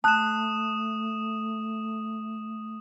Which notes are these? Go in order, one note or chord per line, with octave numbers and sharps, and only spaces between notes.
A3 A5 D#6 F#6 E7